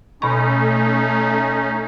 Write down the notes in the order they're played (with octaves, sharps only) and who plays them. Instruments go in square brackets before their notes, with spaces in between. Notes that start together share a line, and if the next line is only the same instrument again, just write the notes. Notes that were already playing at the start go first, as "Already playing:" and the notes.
[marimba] B2 C#6 [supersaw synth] A3 [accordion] C#4 D#4